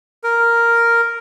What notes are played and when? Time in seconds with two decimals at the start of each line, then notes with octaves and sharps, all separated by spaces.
0.24 A#4